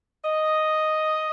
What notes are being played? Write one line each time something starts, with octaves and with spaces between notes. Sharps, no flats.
D#5